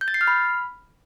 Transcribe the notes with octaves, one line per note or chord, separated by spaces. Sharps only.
G6
A6
C7
F6
B5